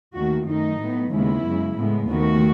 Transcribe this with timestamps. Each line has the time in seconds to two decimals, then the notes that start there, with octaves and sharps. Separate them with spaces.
0.15 D#2 D#3 A3 F#4
0.47 F#2 D#3 A3 D#4
0.80 A2 F#3 B3
1.12 D#2 C#3 G#3 B3 E4
1.45 F#2 C#3 G#3
1.78 A2 G#3 B3
2.09 D#2 D#3 A3 F#4